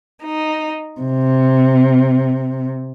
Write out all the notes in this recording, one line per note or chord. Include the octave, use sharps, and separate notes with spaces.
D#4
C3